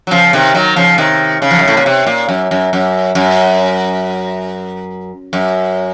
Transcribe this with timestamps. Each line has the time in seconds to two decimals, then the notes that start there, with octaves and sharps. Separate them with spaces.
0.07 F#3
0.11 C#3 F3
0.33 C3 D#3
0.54 D#3 F#3
0.76 C#3 F3
0.98 C3 D#3
1.42 C#3
1.51 F3
1.59 F#2
1.68 A2
1.77 A#2
1.86 C3
2.07 A#2
2.29 F#2
2.51 F#2
2.73 F#2
3.15 F#2
5.33 F#2